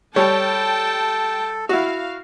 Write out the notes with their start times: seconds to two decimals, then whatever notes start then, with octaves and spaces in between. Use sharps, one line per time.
0.16 G3 A4 C#5 G5 A5
1.69 E4 F#4 F5